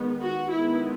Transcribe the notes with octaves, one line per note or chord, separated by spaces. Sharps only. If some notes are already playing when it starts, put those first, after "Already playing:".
Already playing: D#3 G#3 B3
F#4
D#3 G#3 B3 E4